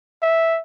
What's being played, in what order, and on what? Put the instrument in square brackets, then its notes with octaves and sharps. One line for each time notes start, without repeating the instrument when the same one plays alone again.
[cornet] E5